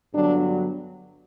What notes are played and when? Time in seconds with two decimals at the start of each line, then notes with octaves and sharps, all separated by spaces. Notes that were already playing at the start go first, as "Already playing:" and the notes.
0.14 G2 D3 F#3 B3 D4